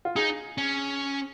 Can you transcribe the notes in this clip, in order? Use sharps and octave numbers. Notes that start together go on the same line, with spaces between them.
F4
D#4 G#4
C#4